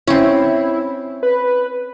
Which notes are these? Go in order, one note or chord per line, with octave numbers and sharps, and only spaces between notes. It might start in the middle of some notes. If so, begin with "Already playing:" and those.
C4 C#4 E4
B4